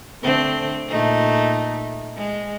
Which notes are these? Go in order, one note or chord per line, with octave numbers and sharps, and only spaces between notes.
D3 A3 C4
A#2 A3 D#4
G#3